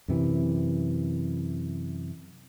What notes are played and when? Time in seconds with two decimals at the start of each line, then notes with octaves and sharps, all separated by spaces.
0.08 F#2 C3 E3